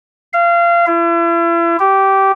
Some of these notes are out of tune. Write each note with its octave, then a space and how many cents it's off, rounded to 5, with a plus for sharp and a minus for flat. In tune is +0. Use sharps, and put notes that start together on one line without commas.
F5 -25
E4 +40
G4 -15